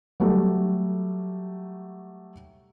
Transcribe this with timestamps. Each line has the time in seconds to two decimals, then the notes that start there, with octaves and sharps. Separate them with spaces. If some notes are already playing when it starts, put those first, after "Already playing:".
0.20 F#3 G3 A3